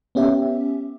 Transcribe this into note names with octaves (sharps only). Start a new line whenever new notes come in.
B3 C#4 G4 E5